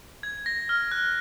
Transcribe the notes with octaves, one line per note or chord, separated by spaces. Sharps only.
G#6
A#6
F6
F#6